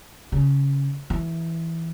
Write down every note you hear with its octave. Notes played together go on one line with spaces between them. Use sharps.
C#3
E3